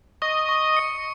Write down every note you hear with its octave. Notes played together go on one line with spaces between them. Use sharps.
D#5 C#6
C#6
C#7